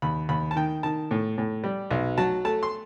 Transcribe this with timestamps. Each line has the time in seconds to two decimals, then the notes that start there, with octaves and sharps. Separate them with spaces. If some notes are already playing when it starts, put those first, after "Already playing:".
0.02 D#2 B5
0.29 D#2 B5
0.51 A5
0.56 D#3 G5
0.83 D#3 A5
1.11 A2
1.38 A2
1.64 G3
1.91 B1
2.18 F#3 A5
2.45 A3 A5
2.63 C6